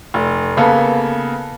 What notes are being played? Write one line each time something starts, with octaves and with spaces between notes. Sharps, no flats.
F1
C#3 A#3 B3 A4